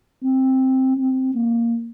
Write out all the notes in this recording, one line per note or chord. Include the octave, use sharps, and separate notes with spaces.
C4
C4
A#3